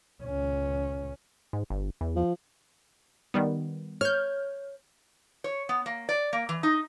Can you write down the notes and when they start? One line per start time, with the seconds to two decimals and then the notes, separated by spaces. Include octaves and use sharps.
0.23 C#2 C#4
1.53 G#2
1.70 G1
2.01 E2
2.16 F3
3.34 D#3 G3 B3
4.01 C#5 F6 G6
5.44 C#5
5.69 B3
5.86 A#3
6.09 D5
6.33 A#3
6.49 E3
6.63 D#4